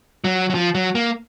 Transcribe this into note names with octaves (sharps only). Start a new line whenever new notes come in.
F#3
F#3
F3
F#3
A#3